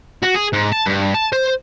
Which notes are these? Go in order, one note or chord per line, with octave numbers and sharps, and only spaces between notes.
F#4
G#4
G#2
A5
G2
A5
C5